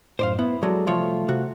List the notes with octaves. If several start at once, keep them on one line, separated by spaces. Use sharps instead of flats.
F#2 A2 C5 D5 F5
B3 E4
F#3 G#3 A4 D5
C2 F3 A3 F4 C#5
C3 F#4